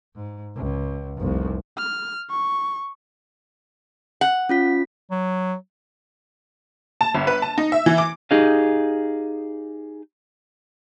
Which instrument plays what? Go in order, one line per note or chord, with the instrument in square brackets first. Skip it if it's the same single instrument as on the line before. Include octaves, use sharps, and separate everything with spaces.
[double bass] G#2
C#2
F1 C2
[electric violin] F6
C#6
[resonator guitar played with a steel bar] F#5
[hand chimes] C#4 F4 B6
[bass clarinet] F#3
[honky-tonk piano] A5
G1
B4
A5
D#4
E5
E3
D6
[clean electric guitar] D#4 G4 G#4 D#5 F5